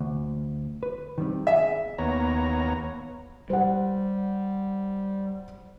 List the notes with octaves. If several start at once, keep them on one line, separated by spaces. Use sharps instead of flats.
D2
B4
D#3 G3 C4
G#4 E5
D#2 B3 C#5 A#5
G3 C5 F#5